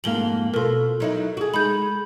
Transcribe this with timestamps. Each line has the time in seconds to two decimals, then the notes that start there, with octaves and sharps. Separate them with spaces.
0.04 F2 G#2 A#3 F#7 G7
0.54 B2 F4 A4 A#4
1.00 F#3 D#4 E4
1.37 F#4 G#4
1.54 G#3 D#4 B5 G6